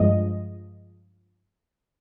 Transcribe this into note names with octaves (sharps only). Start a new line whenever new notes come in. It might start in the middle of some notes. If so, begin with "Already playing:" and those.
Already playing: G2 F3 G#3 D#5